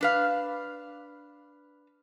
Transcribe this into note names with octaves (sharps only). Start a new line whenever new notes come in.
D4 B4 F5